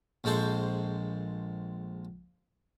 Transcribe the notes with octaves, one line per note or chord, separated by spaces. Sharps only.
A#1 G#3 A4 C5 C#6